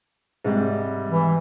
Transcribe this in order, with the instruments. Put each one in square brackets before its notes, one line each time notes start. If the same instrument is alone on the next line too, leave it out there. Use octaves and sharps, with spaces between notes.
[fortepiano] G#2 C3 G3
[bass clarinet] E3